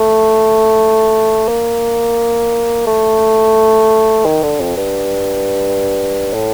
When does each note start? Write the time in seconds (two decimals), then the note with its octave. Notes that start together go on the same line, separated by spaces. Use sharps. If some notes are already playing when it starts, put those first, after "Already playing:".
Already playing: A3
1.48 A#3
2.87 A3
4.25 D#3
4.43 D3
4.60 F2
4.77 G2
6.34 A2